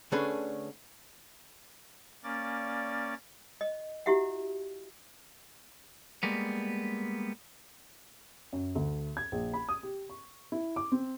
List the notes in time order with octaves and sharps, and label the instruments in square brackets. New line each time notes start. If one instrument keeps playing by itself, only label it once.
[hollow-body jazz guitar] D3 A3 C#4 D4 G#4 B4
[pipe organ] A#3 C#4 D5 A6
[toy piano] D#5
E4 F#4 G4 E5 F#5
[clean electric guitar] G3 G#3 A#3 B3
[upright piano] F#2
D2
G#6
A#1
B5
D#6
G4
C#6
E4
D6
C4